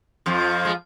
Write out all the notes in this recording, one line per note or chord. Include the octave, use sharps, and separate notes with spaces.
F2 F3
G#3